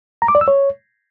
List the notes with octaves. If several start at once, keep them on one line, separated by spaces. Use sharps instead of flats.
A#5
D6
D5
E6
C#5